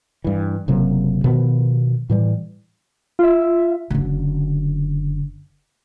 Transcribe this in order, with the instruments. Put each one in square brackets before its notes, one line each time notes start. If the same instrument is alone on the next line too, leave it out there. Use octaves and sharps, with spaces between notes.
[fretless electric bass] G2 E3
F#1 C3 F#3 A#3
B2 D#3 F3 B3
A2 E3 G3
[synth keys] F4 E5
[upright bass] F#1 D3